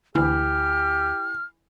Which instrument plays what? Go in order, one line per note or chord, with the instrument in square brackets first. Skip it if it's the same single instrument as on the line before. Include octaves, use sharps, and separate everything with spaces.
[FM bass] D2 [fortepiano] E3 [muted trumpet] G4 [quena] F6